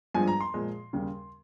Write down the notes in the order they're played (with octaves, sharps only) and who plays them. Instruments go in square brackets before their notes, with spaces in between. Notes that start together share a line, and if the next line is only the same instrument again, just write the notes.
[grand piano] G2 F3 G#3 G#5
A#5
C6
A#2 F3 G#3
D#2 C#3 G3